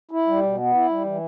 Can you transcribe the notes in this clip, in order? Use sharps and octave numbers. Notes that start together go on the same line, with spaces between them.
E4
G3
B2
B3
E4
G3
E3